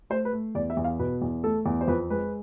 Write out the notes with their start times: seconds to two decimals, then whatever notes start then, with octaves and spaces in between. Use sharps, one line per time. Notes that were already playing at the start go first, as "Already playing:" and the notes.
0.10 A3 C5
0.25 B4
0.33 A3
0.55 E2 D5
0.70 E5
0.77 E2
0.84 F5
0.99 B2 B4
1.22 E2
1.43 A3 A4
1.66 E2
1.81 C5
1.88 F2 B4
2.10 G#3 B4